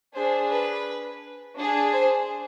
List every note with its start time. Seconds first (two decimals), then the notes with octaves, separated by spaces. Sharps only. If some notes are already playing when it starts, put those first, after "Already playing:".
0.15 D4 G#4 C5
0.50 B4
1.57 D4 G#4
1.93 C5